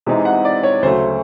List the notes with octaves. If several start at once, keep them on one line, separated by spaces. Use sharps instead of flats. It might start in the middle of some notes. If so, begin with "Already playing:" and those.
C3 E3 G#3 C4 D#4
F#5
D5
C#5
D2 C#3 F#3 A3 C5